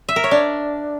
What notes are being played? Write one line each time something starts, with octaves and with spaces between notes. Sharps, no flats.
E5
A#4
C#5
D4